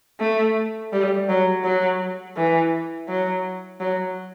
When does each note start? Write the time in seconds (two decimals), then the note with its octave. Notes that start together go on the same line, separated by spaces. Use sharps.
0.20 A3
0.92 G3
1.29 F#3
1.64 F#3
2.36 E3
3.08 F#3
3.80 F#3